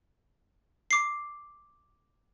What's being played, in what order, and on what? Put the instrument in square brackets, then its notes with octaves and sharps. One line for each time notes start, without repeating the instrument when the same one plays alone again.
[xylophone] D6 C7